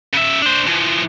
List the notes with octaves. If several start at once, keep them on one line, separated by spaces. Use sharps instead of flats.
C#3 E5
D4 C5
E3 F3